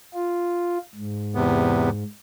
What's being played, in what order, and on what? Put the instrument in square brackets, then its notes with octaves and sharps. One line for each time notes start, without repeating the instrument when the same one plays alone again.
[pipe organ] F4
G#2
[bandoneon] E2 C3 B3